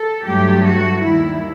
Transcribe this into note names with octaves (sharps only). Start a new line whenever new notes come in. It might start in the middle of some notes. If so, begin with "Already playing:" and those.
Already playing: A4
G2 F#3 A3 G4
F#4
D#2 D#3 G3 E4